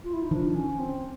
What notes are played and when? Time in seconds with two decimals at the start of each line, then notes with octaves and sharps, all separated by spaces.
0.04 F4
0.13 E4
0.22 D#4
0.31 D#3 F3 D4
0.55 C#4
0.79 C4